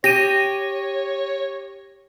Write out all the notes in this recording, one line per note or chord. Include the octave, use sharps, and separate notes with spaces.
G4 C#5 A#6 D#7